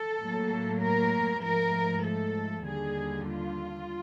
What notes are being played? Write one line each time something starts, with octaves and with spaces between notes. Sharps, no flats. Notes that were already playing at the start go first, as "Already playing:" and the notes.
Already playing: A4
A2 F#3 A#3
A#4
G#2 F3 A3 A#4
A4
D#2 D3 G3 G#4
F4